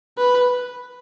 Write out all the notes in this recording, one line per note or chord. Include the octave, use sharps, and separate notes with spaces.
B4